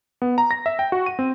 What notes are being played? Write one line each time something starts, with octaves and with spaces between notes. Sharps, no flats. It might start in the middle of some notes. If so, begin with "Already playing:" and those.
B3
A#5
A#6
E5
G5
F#4
D#7
C4